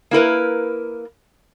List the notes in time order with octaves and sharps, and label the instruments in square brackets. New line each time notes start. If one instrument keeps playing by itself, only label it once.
[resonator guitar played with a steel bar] A#3 E4 A#4 B4